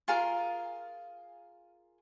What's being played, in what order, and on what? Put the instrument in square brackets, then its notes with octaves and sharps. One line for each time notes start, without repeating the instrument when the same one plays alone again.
[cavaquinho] F4 G#4 A#4